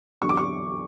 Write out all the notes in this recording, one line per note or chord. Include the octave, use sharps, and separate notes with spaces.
E2 D3 F#3 C#6
D6
C#6